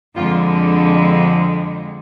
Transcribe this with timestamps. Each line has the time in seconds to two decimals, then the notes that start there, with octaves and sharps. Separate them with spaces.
0.15 F2 D3 G#3 F4